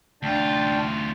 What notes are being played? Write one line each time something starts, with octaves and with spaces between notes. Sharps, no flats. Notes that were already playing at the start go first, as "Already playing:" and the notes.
D2 D4 F4 G5 A5